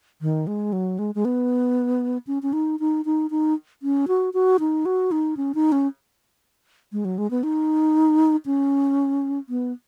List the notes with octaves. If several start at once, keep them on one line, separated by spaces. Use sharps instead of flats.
D#3
G#3
F#3
G#3
G#3
B3
C#4
C#4
D#4
D#4
D#4
D#4
C#4
F#4
F#4
D#4
F#4
D#4
C#4
D#4
C#4
G#3
F#3
G#3
B3
D#4
C#4
B3